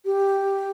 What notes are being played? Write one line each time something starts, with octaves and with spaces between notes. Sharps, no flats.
G4